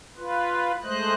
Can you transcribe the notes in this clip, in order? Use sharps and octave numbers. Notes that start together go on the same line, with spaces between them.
F4 B4
G#3 A3 C5 D#5 F#6